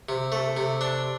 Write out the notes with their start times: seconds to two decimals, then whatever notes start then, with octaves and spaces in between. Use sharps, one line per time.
0.09 C3
0.32 A3
0.57 C3
0.81 D4